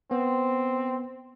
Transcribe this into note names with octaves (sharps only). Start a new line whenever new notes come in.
B3 C4